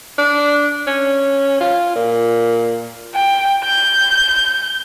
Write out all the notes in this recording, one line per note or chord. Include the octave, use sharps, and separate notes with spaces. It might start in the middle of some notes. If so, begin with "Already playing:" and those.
D4
C#4
F4
A#2
G5
G6